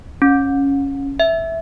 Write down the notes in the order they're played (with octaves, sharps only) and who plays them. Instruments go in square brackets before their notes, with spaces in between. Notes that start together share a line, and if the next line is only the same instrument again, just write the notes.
[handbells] C#4
E5